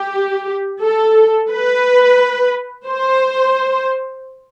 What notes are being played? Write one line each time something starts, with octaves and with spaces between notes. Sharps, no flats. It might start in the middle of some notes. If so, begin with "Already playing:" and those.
Already playing: G4
A4
B4
C5